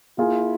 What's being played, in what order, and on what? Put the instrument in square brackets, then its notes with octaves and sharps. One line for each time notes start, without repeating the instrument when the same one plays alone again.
[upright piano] A#3 F4 G#4 [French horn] E4